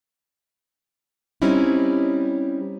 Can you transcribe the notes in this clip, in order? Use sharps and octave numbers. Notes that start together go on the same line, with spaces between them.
G3 C4 C#4 D#4 E4